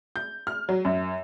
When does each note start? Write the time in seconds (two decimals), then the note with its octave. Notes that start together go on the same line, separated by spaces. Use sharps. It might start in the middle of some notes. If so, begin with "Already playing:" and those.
0.16 G6
0.47 F6
0.69 F#3
0.85 F#2